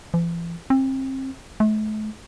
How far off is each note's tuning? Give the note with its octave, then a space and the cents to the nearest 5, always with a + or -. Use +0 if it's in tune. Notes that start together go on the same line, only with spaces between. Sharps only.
E3 +45
C4 +30
A3 -40